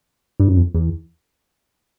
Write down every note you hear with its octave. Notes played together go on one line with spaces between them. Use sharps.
G2
F#2
F2
E2